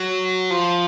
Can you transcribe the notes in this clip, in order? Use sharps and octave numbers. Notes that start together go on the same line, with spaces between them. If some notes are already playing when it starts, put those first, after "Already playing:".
Already playing: F#3
F3